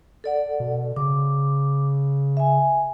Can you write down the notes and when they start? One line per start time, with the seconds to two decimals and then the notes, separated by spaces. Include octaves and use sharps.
0.24 A4 D5 F#5
0.60 B2
0.96 C#3 D6
2.37 E5 G#5